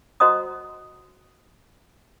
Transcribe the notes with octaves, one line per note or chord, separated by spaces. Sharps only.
F#4 C5 D#5 F#5 A#5 D#6